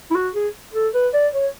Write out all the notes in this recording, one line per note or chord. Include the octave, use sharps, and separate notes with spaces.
E4
F#4
G#4
A4
B4
D5
C#5